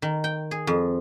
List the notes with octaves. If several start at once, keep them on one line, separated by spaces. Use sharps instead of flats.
D#3
G5
G#4
F2